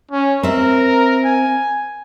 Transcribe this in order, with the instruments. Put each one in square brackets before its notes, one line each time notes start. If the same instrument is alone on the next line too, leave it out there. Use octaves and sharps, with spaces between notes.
[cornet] C#4
[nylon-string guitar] C4 E5 [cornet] A#4
[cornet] G#5